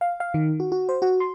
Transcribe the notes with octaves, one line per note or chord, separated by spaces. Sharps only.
F5
F5
D#3
F#4
F#4
C5
F#4
C6